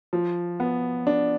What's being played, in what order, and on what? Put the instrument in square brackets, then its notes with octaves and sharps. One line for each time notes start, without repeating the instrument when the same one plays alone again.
[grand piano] F3
B3
D4